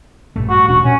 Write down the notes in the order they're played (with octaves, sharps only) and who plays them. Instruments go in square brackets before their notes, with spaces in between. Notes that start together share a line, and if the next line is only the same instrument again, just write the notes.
[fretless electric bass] A#1 G2 A3
[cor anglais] F#4
[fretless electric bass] E1 D4 [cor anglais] F#4
[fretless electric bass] G2 A#2 [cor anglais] C#4